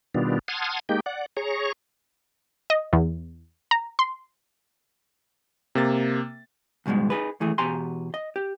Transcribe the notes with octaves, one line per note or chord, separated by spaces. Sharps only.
B2 D#3 G3 B3 D4 F4
F#5 A5 C6 D#6 F6 G#6
G#3 A#3 D#4 G4 G5
D5 F#5
G#4 C#5 A#5 C#6
D#5
E2
A#5
C6
C3 A#3 A6
D#2 G#2 B2 G3 G#3
D#4 F4 G#4 B4
D#2 E3 A3 G#4
E2 B2 G4 G#5 A#5 C6
D#5
G4